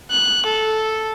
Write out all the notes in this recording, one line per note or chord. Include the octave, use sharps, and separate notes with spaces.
F#6
A4